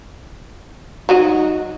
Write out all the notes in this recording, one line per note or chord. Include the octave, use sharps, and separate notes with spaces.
F#3 D#4 F#4 D#5